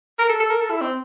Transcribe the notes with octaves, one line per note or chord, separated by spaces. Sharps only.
A#4
A4
A4
A#4
A4
E4
C4